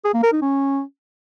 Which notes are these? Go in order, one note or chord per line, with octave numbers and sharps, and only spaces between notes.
G#4
A#3
A#4
D#4
C#4